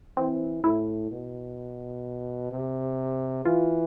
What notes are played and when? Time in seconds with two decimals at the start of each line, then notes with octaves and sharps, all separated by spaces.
0.17 E3 C4
0.64 A2 E4
1.11 B2
2.52 C3
3.45 E3 F4